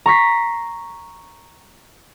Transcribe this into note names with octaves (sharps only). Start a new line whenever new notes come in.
A#5 C#6 B6 C7